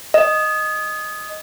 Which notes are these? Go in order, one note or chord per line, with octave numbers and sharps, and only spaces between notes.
D#5